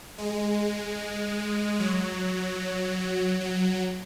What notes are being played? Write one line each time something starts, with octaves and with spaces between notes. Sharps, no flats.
G#3
F#3
F#3